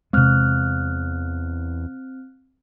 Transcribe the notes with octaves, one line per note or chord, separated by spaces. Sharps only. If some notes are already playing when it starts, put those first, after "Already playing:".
E2 C3 G#3 C4 F6 F#6